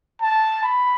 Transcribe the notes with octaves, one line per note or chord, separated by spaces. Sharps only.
A5
B5